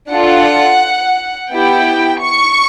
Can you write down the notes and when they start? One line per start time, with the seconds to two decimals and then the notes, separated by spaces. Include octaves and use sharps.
0.10 D4 F4 A4 F#5
1.51 B3 E4 G4 G5
2.22 C#6